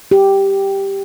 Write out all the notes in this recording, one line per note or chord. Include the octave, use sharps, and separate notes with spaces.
G4